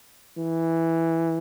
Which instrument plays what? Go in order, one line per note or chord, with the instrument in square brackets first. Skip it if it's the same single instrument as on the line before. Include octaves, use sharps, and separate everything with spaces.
[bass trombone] E3